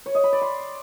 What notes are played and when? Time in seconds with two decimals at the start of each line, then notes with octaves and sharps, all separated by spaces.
0.06 C#5
0.15 D#5
0.24 B5
0.33 D5
0.42 C6